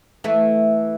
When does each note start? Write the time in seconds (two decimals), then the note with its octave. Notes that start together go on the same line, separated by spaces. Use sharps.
0.24 E3 A3